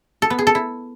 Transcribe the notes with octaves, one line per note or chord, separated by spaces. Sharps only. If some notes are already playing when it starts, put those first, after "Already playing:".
A4
B3
G#4
A4
E4